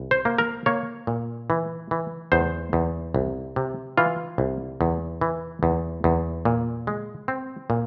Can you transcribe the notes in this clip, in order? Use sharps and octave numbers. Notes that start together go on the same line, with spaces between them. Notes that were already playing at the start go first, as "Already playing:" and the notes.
Already playing: C2
C5
A#3
A#4
A#3 C#5
A#2
E3
E3
E2 C5
E2
C2
C3
E3 F4
C2
E2
E3
E2
E2
A#2
G#3
C4
A#2